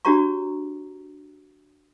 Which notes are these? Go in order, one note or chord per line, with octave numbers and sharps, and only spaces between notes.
D4 F#4 G4 C#5 A#5 C#6